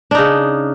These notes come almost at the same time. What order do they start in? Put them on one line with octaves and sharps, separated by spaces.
D4 D#4 C#3